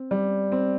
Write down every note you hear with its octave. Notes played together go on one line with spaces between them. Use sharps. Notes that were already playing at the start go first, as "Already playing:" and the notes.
Already playing: C4
G3
C4